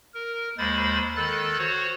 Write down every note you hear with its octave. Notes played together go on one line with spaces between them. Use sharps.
A#4
D#2 G#3 C5 B5 A6
D#3 A4 F#6 A6
F#4 C5 C#5